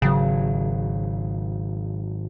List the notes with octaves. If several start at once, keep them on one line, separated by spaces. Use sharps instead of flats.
G#1 C#3 F#3